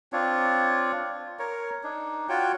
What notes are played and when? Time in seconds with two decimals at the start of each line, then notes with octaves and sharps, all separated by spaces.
0.13 C4 D4 F4 C#5
1.39 A#4 C#5
1.84 D4 D#4
2.29 F4 F#4 C#5 G5